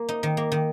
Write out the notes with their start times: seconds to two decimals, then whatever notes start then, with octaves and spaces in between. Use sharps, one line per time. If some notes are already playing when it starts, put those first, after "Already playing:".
Already playing: A#3
0.09 D#4
0.23 D#3
0.37 A#3
0.52 D#3